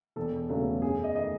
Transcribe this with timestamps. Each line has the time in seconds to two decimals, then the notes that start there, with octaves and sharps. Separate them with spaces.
0.16 E1 A4
0.49 E2 C#3 F#3 A3
0.82 F#2 G#4
1.04 D#5
1.15 D#3 A3 D#5